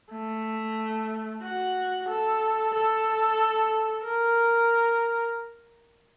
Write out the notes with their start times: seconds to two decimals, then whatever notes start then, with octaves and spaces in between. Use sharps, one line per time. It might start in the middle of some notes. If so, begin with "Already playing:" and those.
0.12 A3
1.43 F#4
2.08 A4
2.73 A4
4.04 A#4